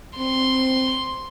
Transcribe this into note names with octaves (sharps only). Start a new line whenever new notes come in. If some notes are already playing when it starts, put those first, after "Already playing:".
C4 C6